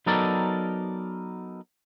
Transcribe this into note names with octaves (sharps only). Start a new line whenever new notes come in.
F#3 B3 D#4 A4 A#4 D5